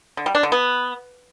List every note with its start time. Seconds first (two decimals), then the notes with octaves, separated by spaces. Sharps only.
0.17 D3
0.26 G3
0.35 D4
0.43 D3
0.52 B3